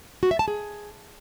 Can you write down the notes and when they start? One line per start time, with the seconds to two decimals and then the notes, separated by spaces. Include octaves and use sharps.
0.23 F#4
0.31 E5
0.39 A5
0.48 G#4